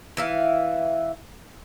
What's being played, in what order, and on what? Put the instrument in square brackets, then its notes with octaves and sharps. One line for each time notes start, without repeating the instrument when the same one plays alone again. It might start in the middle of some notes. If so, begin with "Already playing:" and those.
[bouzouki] E3 E4 F5